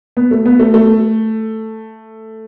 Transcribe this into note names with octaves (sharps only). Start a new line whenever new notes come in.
B3
A3
B3
A3
A3